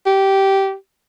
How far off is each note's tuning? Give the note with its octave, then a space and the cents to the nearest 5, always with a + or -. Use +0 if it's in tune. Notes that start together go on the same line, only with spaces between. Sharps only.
G4 -15